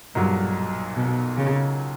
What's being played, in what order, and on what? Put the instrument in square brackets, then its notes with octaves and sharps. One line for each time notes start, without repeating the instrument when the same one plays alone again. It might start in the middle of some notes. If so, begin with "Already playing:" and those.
[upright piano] B1 A#2 F#3 [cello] G2
[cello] B2
C#3